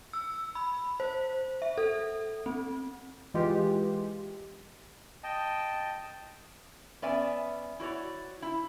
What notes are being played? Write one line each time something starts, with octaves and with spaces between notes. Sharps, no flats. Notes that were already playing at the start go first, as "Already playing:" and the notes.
E6
B5
C5
E5
A4
C4
E3 G#3 F4 G4
D#5 G5 A5
B3 C#4 D5 E5 G#5
E4 F#4 C#5 D5
E4